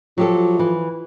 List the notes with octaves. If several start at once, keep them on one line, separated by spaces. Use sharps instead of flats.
F3 F#3 G4 A4
E3